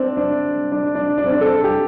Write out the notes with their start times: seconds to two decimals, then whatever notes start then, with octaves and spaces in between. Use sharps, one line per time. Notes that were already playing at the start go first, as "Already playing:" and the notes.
Already playing: C4 D4
0.17 D4
0.72 D4
0.95 D4
1.18 D4
1.26 C4
1.33 D4
1.41 A4
1.64 G4